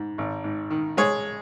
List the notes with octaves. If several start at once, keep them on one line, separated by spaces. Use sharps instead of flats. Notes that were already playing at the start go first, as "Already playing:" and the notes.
Already playing: G#2
G#1
G#2
D#3
G#3 G#4 C#5